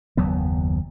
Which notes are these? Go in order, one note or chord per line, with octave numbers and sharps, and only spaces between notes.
F#1 D#2 F#3 B3